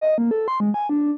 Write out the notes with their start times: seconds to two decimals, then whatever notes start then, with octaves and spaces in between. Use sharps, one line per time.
0.01 D#5
0.18 A#3
0.31 A4
0.48 C6
0.60 G#3
0.74 G#5
0.89 D4